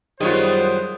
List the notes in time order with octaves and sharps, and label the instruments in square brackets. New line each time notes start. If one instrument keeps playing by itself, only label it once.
[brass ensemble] F#2 C5 [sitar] D#3 B3 F4 [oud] G3 [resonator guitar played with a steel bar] G#3 C#5